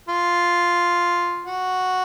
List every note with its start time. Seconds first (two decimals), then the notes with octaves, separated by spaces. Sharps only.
0.09 F4
1.47 F#4